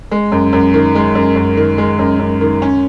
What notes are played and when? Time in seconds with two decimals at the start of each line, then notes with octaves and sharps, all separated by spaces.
0.11 G#3
0.32 F#2
0.53 F#2
0.74 D#3
0.95 G#3
1.15 F#2
1.36 F#2
1.57 D#3
1.78 G#3
1.99 F#2
2.19 F#2
2.41 D#3
2.62 C#4